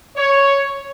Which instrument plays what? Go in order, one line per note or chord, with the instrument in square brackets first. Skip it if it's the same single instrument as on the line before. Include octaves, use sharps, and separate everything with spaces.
[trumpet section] C#5